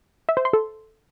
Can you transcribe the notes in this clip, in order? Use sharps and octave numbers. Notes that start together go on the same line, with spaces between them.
E5
C5
C6
A4